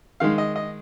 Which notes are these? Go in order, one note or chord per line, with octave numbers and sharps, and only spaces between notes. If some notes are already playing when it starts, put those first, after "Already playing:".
D#3 G#3 F5
D#5
D#5